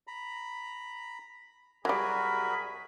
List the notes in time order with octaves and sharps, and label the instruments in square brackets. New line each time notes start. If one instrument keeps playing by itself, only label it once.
[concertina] A#5 B5
[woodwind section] C2 G#4 B5 [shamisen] F#3 G3 [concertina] F#4 A#4